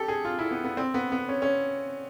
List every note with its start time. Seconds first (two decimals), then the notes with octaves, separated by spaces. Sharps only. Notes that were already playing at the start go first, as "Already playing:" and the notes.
Already playing: G4 A4
0.08 G#4
0.25 F4
0.39 E4
0.51 B3
0.64 B3
0.77 C4
0.94 B3
1.12 B3
1.29 C#4
1.42 C#4